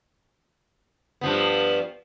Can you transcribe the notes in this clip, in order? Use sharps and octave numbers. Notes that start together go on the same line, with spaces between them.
G2 F3 B3